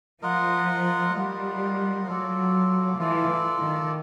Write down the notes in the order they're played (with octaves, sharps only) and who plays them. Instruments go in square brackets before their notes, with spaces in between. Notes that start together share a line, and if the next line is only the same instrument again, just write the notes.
[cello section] F3 [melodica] F4 A#4 D#5 F#5
[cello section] G3 [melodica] F4 A#4 D#5 F#5
[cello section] F#3 [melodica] F4 A4 D5
[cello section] E3 [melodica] F4 A4 D5
[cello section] D#3